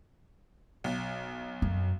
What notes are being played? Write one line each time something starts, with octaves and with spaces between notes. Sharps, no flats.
B1
F#2